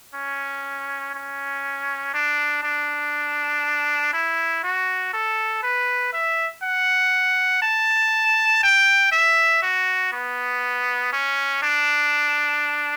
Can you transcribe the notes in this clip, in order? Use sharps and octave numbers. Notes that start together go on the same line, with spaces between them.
C#4
C#4
D4
D4
E4
F#4
A4
B4
E5
F#5
A5
G5
E5
F#4
B3
C#4
D4